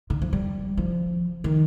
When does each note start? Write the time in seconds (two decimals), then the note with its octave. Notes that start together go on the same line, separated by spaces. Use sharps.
0.10 D3
0.22 F3
0.33 G3
0.77 F3
1.44 D#3